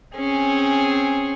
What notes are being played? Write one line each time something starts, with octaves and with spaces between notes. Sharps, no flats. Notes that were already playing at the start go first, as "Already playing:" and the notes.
C4 C#4 G#4